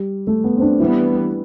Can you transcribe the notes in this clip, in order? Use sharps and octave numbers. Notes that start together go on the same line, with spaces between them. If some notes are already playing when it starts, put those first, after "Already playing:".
Already playing: G3
A3
B3
C4
D4
E3 G3 B3 E4